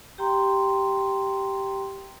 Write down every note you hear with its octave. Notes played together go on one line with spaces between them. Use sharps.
G4 G5 A#5 C6